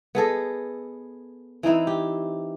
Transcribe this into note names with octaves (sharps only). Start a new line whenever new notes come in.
B3 G#4 A4 D#5
E3 C4 D#4 E4
G4